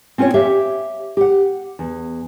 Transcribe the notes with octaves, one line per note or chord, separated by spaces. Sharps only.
C4 C#4 F4 B4 C#5
G4 C#5 E5 F5
G4 F#5
E2